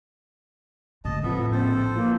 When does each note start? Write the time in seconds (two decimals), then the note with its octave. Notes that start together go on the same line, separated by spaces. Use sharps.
1.05 D3 A3 D#5 A5
1.23 F2 A2 F3 B3 A4 E5
1.52 A#1 C4 A4 C5 A6
1.95 E3 F3 A#3